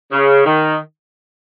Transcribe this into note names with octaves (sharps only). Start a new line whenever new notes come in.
C#3
D#3